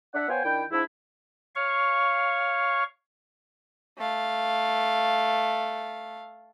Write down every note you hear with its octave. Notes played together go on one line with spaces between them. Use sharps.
D4 E5 F#5
B3 F4 C5 C#5 G5 G#5
D#3 D4 E4 G5
G#2 F3 D4 E4
C#5 F5 C#6
A3 F5